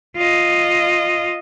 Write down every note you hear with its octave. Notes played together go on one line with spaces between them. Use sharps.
F4 D#5